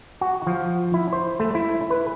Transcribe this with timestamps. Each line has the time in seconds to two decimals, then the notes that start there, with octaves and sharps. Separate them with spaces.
0.21 F#4
0.47 F3
0.94 E4
1.13 C5
1.40 A3
1.55 E4
1.90 B4